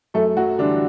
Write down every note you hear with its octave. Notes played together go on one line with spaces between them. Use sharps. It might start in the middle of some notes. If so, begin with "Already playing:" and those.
F#2 A3 A4
F#3 F#4
D3 E3 G3 D4